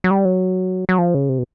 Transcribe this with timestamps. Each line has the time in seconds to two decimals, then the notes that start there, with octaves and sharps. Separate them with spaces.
0.04 F#3
0.11 G3
0.25 F#3
0.89 F#3
0.98 F3
1.14 C#3
1.29 C3
1.39 B2